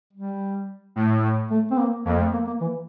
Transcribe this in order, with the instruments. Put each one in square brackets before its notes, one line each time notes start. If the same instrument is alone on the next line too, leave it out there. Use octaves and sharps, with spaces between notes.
[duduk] G3
[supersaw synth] A2
[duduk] A3
C4
A#3
[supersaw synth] F2 [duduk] A#3
[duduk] A3
A#3
A#3
E3